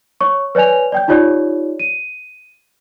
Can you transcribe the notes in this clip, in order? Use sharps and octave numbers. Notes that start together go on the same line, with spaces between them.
C#5 C#6
B4 C#5 D5 G#5 F7
D5 G5 G6
D#4 F4 G4 C#5 D5
D#7